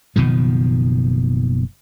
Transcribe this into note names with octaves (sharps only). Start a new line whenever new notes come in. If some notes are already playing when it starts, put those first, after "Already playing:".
F#1 B2 D#3 F3